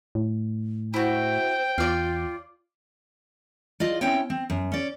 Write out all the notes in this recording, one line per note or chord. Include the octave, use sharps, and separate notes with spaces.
A2
E4 F#4 C5 G5
E2 F4 D5 F5
F4 D5 D#5
C4 C#4 E4 C#5 G5
C4
F#2
C#4 D5